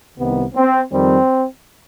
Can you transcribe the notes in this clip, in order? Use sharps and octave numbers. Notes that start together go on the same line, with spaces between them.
C2 C3 D#3 B3
C4
F2 D#3 G3 C4